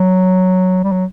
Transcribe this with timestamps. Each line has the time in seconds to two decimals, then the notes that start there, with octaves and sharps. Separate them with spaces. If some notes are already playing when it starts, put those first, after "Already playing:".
Already playing: F#3
0.84 G3
0.92 F#3